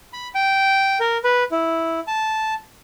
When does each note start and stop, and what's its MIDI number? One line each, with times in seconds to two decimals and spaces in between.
0.13 0.28 83
0.35 0.99 79
1.00 1.18 70
1.24 1.44 71
1.51 2.00 64
2.07 2.54 81